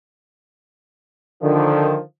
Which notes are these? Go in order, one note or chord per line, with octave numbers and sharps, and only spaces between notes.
D3 D#3 F3